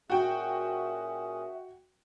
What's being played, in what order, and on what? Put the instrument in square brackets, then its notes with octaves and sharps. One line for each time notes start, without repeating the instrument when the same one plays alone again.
[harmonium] A#2 C#4 G#4 [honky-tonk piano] F#4 G5 [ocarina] E5